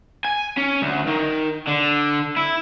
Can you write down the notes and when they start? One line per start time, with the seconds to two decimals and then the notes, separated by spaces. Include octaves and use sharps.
0.25 G#5
0.58 C#4
0.82 D2
1.07 D#3
1.68 D3
2.36 E4